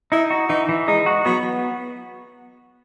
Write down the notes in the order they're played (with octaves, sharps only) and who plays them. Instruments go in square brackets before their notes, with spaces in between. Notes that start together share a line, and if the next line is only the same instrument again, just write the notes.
[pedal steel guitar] D#4 [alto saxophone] E4
[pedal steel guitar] F#4
[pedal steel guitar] E3 [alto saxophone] D#4
[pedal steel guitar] E3
[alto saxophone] G#3 [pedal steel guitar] D#4
[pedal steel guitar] F#4
[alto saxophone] F#3 [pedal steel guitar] B3